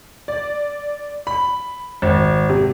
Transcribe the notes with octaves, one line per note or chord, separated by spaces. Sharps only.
D5
B5
G#1
C3